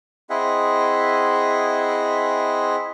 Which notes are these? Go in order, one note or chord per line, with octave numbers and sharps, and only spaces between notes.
C4 E4 G#4 D#5 E5 F#5